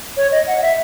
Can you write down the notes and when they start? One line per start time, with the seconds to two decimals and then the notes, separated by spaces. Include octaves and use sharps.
0.17 C#5
0.32 D#5
0.47 F#5
0.62 E5